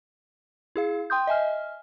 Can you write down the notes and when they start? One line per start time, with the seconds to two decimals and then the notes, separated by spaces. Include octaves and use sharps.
0.76 E4 G#4 F5
1.10 G5 C6 D#6 G6
1.27 D#5 E5 G#5 F6